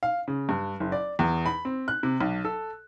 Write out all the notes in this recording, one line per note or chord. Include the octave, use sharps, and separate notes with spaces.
F5
C#3
G2
F#1
D5
E2
B5
C4
F#6
C3
B1
A4